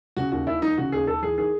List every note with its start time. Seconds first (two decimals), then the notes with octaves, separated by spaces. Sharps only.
0.17 C#3 F#4
0.32 D#2 F#4
0.47 D#2 E4
0.62 E3 D#4
0.77 C#3 F#4
0.92 D#2 G#4
1.07 D#2 A4
1.23 E3 G#4
1.38 D#3 G#4